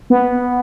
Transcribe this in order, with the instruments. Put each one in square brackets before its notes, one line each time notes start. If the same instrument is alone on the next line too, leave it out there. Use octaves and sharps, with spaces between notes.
[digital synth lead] B3